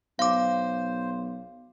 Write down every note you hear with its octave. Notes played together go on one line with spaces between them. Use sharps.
B1 C5 F5 D6